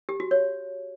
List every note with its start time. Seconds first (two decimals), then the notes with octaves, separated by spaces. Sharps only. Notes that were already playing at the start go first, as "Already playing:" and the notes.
0.09 G4
0.20 F#4
0.31 C#5